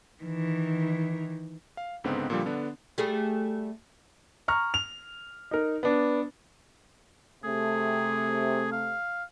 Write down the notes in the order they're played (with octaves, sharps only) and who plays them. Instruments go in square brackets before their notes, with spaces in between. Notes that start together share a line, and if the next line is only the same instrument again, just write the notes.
[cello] D#3 E3
[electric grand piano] F5
C#2 G#2 D3 B3 C4
A#2 D3 F3 G3
D3 B3 D4
[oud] G3 A3 G#4
[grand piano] A#5 C#6 F6
F7
D#4 A#4
B3 D4
[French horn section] C3 A3 [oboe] G#4
[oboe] F5